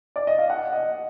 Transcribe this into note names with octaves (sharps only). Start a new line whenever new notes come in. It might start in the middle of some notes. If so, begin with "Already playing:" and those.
D5
D#5
F5
F#5
D#5